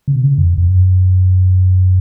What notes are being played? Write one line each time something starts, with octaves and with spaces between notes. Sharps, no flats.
C#3
B2
C#3
F2
F2
F#2